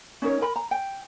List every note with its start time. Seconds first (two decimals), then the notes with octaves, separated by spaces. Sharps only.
0.22 C#4 D#4 A#4 C#5
0.41 A#4 B5
0.56 A#5
0.71 G5